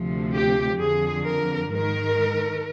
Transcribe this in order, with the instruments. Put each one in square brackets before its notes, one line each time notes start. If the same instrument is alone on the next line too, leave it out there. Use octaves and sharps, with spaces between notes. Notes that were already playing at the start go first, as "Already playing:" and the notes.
Already playing: [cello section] D2 C3 F3
G4
F2 D3 F3 G#4
A#4
G#2 D#3 A#4